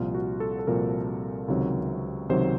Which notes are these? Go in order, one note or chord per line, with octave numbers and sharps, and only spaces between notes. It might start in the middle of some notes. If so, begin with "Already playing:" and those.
Already playing: C2 A#2 F3 F4
F#4
A4
A4
C2 A#2 F3 A#4
C#2 C3 D#3 F#3
C#2 C3 D#3 F#3 C5